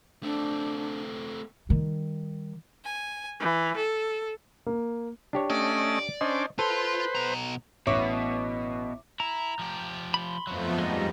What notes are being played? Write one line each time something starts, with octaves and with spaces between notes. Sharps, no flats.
A3 C4 D4
D#3 G3
G#5
E3
A4
A#3
D4 G4 C#5
A3 C#4 D5 D#5
C#4 D4 C5 D#5
F4 A4 B4 C5 C6
B2 A#5
A1 B2 C#5 E5 C#6 D6
E4 A#5
F3 G4
B5 C6
F2 F3 F#3 A3 B3
G3 G#3 D#4